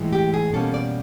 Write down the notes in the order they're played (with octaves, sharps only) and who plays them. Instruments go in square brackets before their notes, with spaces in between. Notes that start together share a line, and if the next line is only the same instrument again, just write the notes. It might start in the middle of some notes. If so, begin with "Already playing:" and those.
Already playing: [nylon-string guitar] A2 E3 G#3
G4
G#4
B2 G3 A#3 C#4 A4
D5